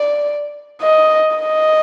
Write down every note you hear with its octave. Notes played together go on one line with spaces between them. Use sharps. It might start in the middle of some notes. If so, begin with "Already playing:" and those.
Already playing: D5
D#5
D#5